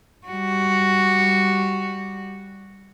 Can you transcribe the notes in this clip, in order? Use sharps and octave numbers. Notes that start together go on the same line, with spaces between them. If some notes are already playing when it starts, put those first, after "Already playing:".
G3 F#4